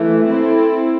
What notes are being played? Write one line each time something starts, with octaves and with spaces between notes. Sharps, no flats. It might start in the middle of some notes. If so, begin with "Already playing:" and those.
Already playing: E3 A3
C4 E4 A4